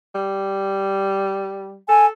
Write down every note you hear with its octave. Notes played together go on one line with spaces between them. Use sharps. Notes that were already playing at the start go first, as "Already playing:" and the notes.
G3
A4 G#5